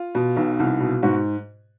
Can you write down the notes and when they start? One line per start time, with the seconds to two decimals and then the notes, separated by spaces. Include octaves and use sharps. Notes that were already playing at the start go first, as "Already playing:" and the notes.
Already playing: F4
0.15 B2
0.37 B1
0.59 C2
0.80 B2
1.03 G#2 F#4